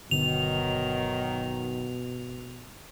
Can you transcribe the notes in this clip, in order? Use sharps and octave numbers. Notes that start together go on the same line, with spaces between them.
G1 B2 D3 D#3 F#3 B3 F7